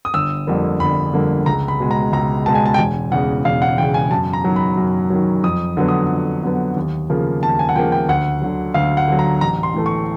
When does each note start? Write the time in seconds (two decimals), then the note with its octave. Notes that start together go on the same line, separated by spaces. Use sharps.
0.05 D#6
0.14 G1 E6
0.47 F2 D3 G3 A#3
0.80 G1 B5
1.14 F2 D3 G3 A#3
1.46 C#2 A#5
1.68 B5
1.80 B2 G#3
1.91 A#5
2.13 C#2 A#5
2.46 B2 G#3 A5
2.55 G#5
2.66 A5
2.74 G5
2.78 E1 G#5
3.12 E2 C#3 F#5
3.45 E1 F5
3.62 F#5
3.78 E2 C#3 G5
3.94 G#5
4.11 F#2 A5
4.33 A#5
4.44 D#3 F#3
4.56 B5
4.78 F#2
5.10 D#3 F#3
5.43 F2 D#6
5.77 D3 F#3 B3
5.88 D#6
6.10 F2
6.43 D3 F#3 B3
6.76 D#2
7.10 C#3 F3 A#3
7.42 D#2 A5
7.59 G#5
7.69 F#5
7.76 C#3 F3 A#3 G5
7.92 G5
8.09 D2 F#5
8.42 D3 F#3
8.74 D2 F5
8.97 F#5
9.08 D3 F#3
9.19 A#5
9.41 A1 A#5
9.63 C6
9.74 A2 E3 A3
9.86 C#6